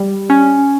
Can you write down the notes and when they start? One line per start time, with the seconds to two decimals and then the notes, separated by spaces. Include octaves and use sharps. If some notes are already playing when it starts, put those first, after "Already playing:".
Already playing: G3
0.30 C#4